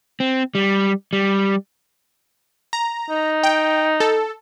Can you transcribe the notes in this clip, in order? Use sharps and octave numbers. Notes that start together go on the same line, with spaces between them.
C4
G3
G3
A#5
D#4
G5
A4